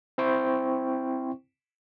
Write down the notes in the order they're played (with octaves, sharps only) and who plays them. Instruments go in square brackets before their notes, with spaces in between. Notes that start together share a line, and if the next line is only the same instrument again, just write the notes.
[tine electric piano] C4 E4 C5 G5 C#6